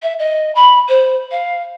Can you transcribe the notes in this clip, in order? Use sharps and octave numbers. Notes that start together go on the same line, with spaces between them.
E5
D#5
B5
C5
F5